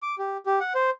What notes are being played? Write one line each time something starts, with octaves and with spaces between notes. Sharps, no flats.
D6
G4
G4
F#5
C5